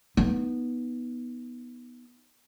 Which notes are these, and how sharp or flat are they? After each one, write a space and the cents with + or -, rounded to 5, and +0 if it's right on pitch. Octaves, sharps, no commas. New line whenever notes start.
B3 -10 D#4 +15